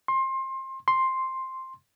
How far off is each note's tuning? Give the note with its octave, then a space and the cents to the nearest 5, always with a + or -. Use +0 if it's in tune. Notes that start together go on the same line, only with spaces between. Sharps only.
C6 +25
C6 +5